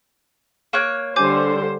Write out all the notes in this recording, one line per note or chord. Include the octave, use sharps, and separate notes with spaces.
A#3 C#5 F#6
D3 G3 C5 G#5 D6 G6